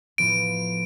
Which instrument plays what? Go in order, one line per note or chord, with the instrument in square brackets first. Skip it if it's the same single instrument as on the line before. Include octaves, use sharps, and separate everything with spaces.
[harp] A2 F3 B3 [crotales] D7